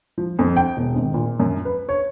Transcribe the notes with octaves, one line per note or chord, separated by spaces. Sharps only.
F3
F2
G5
E1
G#1
A#2
F#2
B4
C#5